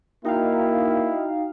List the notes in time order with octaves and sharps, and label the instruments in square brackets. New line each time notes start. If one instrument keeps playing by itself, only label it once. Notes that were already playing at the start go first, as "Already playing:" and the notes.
[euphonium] A#3 [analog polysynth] D#4 F5 [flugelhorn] E4 [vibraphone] F#4 G5